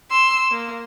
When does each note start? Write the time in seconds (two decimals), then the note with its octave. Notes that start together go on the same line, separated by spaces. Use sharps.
0.11 C6 E6
0.51 A#3